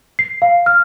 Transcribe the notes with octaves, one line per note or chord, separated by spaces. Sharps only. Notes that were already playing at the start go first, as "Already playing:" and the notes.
C7
F5
F6